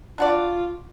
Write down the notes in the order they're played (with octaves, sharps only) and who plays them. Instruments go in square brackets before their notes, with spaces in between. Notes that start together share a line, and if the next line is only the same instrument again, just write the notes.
[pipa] D4 F#4 D5 [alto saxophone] F4